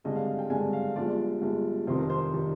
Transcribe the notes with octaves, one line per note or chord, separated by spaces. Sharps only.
G#1 G2 D3 G#3 D#5
F5
G5
G#1 G2 D3 G#3 G#5
F5
G1 G2 F3 G#3 D5
G1 G2 F3 G#3
F1 F2 D#3 G3 C5
A#4
C5
D#3 G3